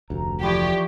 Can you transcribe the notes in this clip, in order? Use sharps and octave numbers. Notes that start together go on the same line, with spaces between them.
F1 D2 A#5
E3 F3 G4 D5 B5 C#6